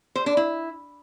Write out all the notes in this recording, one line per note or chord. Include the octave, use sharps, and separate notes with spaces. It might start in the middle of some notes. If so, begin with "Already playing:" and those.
C5
D4
E4